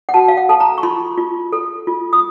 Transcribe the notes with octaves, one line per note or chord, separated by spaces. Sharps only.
F#5
F#4 A5
F5
F#5
A4 A5
A#5
C#6
F4 C6
F4
A4
F4
D#6